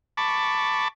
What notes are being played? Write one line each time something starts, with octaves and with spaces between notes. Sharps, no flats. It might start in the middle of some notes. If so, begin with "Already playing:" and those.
A5 B5 C#6 D6